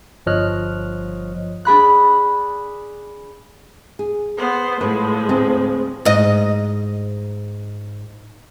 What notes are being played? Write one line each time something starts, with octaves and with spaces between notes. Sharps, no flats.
G1 F3 C#5 D#5 F6 F#6
D4 G#4 B5 F#6
G#4
B3 C5
A2 F3 G#3 B4
D2 C4 G#4
G#2 D#5